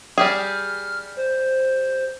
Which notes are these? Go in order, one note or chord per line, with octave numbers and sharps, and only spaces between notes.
G3 G4 G#4 F6
C5